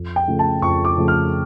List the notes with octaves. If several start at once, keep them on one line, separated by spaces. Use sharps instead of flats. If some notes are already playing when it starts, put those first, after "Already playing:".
Already playing: F2
G5
C#3 F3 A3
A5
F2 C#6
D6
C#3 F3 A3
F6